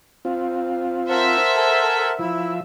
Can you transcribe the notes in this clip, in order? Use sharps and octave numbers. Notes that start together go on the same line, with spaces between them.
C4 F4
A#4 C5 E5 F#5 A5
A4 G#5
F3 E4 E5